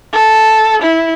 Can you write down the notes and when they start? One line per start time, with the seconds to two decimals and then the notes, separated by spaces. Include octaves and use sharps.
0.13 A4
0.82 E4